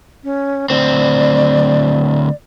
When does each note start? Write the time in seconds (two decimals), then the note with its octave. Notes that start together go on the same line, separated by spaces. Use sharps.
0.24 C#4
0.70 D2 C4 D5